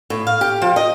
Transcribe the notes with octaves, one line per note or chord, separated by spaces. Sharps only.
A2
F5
G4
F3
D#5